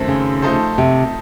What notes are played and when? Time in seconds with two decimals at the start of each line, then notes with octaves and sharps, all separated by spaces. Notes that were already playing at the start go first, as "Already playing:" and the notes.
Already playing: F#2 D#3 A3 C4
0.08 C#3
0.42 F3 A3 D#4 A4 C5
0.78 C3